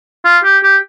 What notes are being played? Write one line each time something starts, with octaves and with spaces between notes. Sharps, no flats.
F4
G4
G4